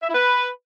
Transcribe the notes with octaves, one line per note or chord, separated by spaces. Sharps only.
E5
E4
B4